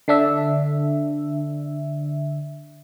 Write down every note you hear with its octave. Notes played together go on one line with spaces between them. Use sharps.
D3 D4 E5